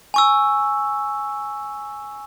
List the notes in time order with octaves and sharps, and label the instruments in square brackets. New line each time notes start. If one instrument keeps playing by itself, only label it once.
[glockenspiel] G#5 C#6 E6